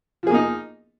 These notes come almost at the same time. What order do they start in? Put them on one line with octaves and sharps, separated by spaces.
F3 G#4 A#3 D#4